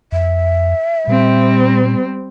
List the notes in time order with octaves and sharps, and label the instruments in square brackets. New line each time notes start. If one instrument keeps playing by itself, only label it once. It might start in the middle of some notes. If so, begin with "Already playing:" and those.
[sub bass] F2 [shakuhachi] E5
[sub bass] A#2 [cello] G3 C4